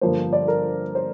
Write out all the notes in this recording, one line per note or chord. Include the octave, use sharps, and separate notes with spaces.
G1 G2 F3 A#3 C5
D5
A#4
C5